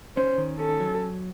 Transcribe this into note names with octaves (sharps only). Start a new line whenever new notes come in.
C#4 C5
D#3
C#4 A4
F#3